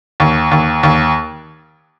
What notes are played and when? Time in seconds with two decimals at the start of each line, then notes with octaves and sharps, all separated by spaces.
0.20 D#2
0.51 D#2
0.83 D#2